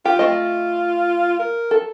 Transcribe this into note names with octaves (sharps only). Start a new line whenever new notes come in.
F4 G4
A3 C4 D#5
A#4
A4